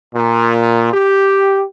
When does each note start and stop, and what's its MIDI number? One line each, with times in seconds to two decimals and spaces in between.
0.13 0.89 46
0.92 1.64 67